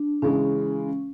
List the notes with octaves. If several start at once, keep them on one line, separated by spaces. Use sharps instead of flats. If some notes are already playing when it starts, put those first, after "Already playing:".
Already playing: D4
C#3 E3 G#3 C#4